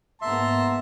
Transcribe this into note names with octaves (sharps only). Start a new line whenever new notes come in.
G#2 A#3 B3 E5 A5 A#5 C6